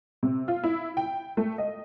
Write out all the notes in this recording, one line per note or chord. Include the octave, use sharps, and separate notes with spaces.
C3
F4
E4
G5
A3
D#5